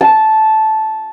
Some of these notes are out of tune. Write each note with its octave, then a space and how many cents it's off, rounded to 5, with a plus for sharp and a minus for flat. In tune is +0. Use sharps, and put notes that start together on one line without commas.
A5 -10